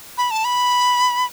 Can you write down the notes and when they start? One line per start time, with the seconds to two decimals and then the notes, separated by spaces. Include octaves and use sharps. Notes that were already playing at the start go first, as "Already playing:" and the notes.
0.18 B5
0.31 A5
0.45 B5